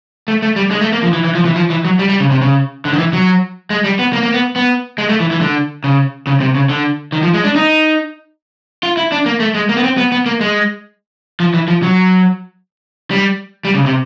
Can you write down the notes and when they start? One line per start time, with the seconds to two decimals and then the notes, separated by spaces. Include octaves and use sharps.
0.28 A3
0.42 A3
0.56 G3
0.71 G#3
0.81 A3
0.92 A#3
1.03 F3
1.13 E3
1.25 E3
1.35 F3
1.45 E3
1.56 F3
1.70 E3
1.85 F#3
1.99 G3
2.09 G3
2.20 C#3
2.31 C3
2.41 C#3
2.85 D3
2.93 D#3
2.99 E3
3.13 F#3
3.70 G#3
3.84 G3
3.99 B3
4.13 A#3
4.23 A#3
4.34 B3
4.56 B3
4.98 G#3
5.09 A3
5.20 E3
5.31 E3
5.41 D3
5.84 C#3
6.27 C#3
6.40 C3
6.55 C#3
6.69 D3
7.12 D#3
7.23 F3
7.34 G#3
7.44 D4
7.55 D#4
8.83 F4
8.97 E4
9.12 D4
9.26 A#3
9.40 A3
9.55 G#3
9.69 A#3
9.77 B3
9.84 C4
9.98 B3
10.12 B3
10.26 A#3
10.41 G#3
11.40 F3
11.54 E3
11.68 F3
11.83 F#3
13.11 G3
13.65 G3
13.75 C#3
13.86 C3